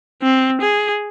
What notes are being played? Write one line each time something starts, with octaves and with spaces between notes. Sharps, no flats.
C4
G#4